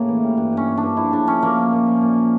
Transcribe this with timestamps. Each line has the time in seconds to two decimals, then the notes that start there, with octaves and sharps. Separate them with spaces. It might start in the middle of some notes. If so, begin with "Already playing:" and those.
Already playing: A2 C#3 A#3
0.08 E3
0.23 G3
0.37 G2
0.53 G2 C#4
0.68 G2
0.77 D4
0.83 G2
0.97 F3 E4
1.12 C#3 D4
1.27 F3 C#4
1.42 F3 A#3
1.57 F3
1.73 A#2
1.87 F3
2.02 A#2